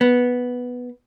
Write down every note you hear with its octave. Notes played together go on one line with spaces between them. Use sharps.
B3